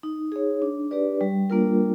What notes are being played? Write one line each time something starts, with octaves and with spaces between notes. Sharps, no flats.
D#4
G#4 C#5
D4
G4 B4 D5
G3
A#3 D4 F4 A#4